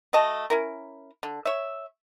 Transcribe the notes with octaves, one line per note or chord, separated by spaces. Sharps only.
A3 F#4 D#5 A5
C#4 E4 A#4
D3
C#5 E5